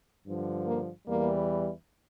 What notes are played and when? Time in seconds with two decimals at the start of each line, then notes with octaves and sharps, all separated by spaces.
0.26 G2 D3 F3
0.66 A#3
1.06 E2 E3 G3 A#3